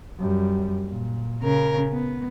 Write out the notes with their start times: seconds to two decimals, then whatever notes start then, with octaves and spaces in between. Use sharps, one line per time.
0.19 F#2 G3
0.87 A#2
1.42 C#3 A#4
1.92 B3